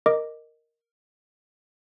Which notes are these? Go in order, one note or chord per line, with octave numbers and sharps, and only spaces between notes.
A#4 D#5 D6